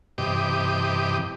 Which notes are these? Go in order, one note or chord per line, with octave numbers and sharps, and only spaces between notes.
G2 C3 E3 G4 D#5 D6